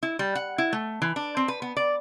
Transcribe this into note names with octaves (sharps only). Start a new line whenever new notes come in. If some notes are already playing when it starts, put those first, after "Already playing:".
E4
G3
F#5
E4
A3
E3
D4
C4
B4
B3
D5